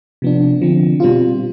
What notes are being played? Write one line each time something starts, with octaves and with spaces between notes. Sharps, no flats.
C3 F3 B3 D4
D3 F3 C4
B2 G3 C4 F4